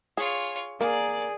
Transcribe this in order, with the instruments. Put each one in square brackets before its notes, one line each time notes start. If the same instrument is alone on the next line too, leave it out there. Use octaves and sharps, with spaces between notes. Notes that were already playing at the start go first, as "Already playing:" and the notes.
[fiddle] F4 C#5 [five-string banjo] G#4
[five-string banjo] A#3 [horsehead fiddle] G#4 [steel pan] A#4 [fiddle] D5